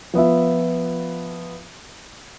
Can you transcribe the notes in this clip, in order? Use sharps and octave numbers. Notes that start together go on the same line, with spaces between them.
F3 B3 F4 E5